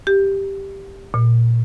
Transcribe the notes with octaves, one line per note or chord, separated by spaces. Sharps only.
G4
A#2